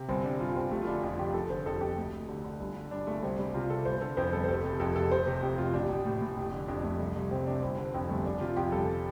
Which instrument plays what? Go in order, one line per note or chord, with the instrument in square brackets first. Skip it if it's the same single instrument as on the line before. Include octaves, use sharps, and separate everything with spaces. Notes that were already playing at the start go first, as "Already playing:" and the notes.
Already playing: [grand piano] C3
G1 C4
D3 D4
G2 F4
G1 C4
F1 A3
F4
D3 D4
F2 F4
F1 G4
F1 A4
D3 C5
F2 A4
F1 G4
D2
D2
D3
D3
G1
D3
G2 D4
G1 A3
C2 C4
C2 D4
C3 F4
C3 A4
G1 C5
D3 A4
F2 C5
G1 A4
C5
F1 A4
C3
F2 A4
F1 A4
F1 C5
C3
F2 G4
F1 F4
A1 D4
A1
A2
A2
F1
D3
F2 D4
F1 A3
C2
C2
C3 C4
C3 D4
G1 C4
D3 C4
F2 C4
G1 A3
G1 D4
C3 F4
F2 G4
G1 A4